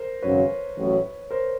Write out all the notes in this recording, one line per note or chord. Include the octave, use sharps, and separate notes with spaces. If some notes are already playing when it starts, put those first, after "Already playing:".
Already playing: A#4 C5
G#1 F#2 C#3 F#3 B4 C#5
A1 A2 F#3
A#4 C5